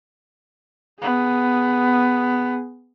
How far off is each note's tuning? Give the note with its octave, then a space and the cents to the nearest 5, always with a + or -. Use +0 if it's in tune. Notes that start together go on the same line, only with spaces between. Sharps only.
B3 +10 G#4 +0